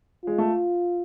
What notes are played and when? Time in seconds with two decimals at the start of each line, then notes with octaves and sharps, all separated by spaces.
0.24 G#3 F4
0.38 A3